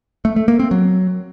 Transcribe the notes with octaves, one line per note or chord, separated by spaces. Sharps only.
A3
A3
A#3
C4
F#3